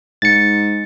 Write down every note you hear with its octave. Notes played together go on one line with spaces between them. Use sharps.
G#2 A6 C#7